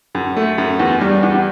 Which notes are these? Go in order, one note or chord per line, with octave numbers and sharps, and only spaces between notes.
F#2
A3
F#2
E2
G3
E2